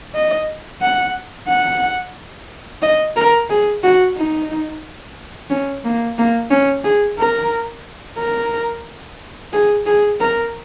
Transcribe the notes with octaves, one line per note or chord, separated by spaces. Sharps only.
D#5
F#5
F#5
D#5
A#4
G#4
F#4
D#4
C#4
A#3
A#3
C#4
G#4
A#4
A#4
G#4
G#4
A#4